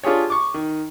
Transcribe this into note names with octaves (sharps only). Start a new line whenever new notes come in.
D4 F4 G4 G#4 C#5
C#6 D6
D#3